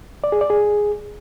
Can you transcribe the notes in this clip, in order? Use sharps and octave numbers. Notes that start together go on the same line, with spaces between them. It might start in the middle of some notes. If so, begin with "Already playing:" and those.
D5
G#4
D5
G#4